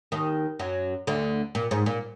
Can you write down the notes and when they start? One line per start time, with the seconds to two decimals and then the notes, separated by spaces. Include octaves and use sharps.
0.12 D#2 D#3
0.59 F#2 F#3
1.07 D2 D3
1.55 A#2
1.71 G#2
1.86 A#2